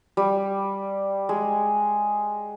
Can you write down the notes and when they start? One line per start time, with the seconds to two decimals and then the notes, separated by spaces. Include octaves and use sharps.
0.17 G3
1.29 G#3